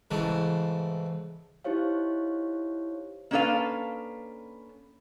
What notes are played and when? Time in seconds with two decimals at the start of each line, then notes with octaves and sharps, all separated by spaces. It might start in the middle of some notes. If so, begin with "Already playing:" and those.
0.11 G#2 C#3 E3 A3
1.64 D#4 E4 G4 C5 C#5 F5
3.31 A#3 C#4 D4 A4 B4 F5